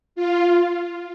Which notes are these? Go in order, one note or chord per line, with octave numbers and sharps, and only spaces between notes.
F4